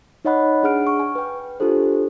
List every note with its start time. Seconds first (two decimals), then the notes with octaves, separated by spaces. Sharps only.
0.25 D#4 C#5 D#5 F#5 B5 F#6
0.63 D4 G#4 F#5 F6 D7
0.87 C#6 F6
1.00 G#5
1.15 B4 G5
1.60 D4 F4 G4 A4 C5